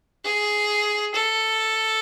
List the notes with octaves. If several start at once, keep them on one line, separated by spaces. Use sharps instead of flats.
G#4
A4